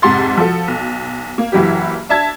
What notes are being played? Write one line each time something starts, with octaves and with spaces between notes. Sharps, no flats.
F2 G#2 C3 F#5 C6 A6
F3 F#4 A4
B1
A#3
F#1 E3 F#3 E4 G4
D4 E5 A5 G#6